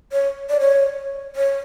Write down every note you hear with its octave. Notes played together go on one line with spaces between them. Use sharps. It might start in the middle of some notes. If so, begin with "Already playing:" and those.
C#5
D5
C#5
C#5